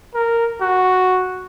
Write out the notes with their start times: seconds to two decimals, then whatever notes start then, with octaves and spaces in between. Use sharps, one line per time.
0.15 A#4
0.62 F#4